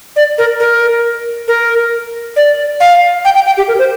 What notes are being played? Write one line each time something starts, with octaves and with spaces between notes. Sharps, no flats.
D5
A#4
A#4
A#4
D5
F5
G5
G5
G5
G4
A#4
C5